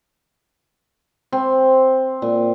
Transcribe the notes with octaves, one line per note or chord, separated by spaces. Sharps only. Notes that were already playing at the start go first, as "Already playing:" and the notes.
C4
A#2